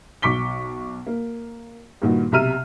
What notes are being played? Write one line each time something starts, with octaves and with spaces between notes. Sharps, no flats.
B1 C#6 D6 B6 G7
A#3
G2 A#2 D#3 F#4
B1 C3 E5 A#5 F6 D#7